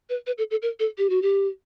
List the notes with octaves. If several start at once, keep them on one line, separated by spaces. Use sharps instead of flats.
B4
B4
A4
A4
A#4
A4
G4
F#4
G4